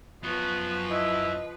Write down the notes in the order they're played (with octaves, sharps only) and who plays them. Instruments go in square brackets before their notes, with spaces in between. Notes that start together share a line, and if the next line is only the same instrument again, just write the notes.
[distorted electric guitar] F#2 F#4 [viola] F3 B4 [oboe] B3
[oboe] E4 [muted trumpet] D#5